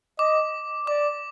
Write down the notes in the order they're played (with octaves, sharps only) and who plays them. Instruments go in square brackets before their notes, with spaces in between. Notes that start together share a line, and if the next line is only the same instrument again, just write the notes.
[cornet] D#5 [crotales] D6
[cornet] D5 [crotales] D6